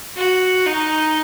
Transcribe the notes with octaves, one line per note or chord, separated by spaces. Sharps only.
F#4
D#4